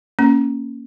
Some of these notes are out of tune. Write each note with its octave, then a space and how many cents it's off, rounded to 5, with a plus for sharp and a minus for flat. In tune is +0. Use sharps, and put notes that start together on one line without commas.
A#3 +0 C#4 +0